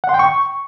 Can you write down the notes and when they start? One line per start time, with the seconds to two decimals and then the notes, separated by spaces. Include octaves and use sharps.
0.04 F#5
0.09 C6
0.14 G5
0.19 C#6